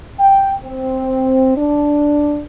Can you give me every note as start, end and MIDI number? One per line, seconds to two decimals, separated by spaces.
0.19 0.52 79
0.65 1.52 60
1.57 2.42 62